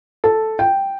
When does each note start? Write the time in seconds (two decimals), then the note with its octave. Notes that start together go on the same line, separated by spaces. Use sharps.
0.24 A4
0.59 G5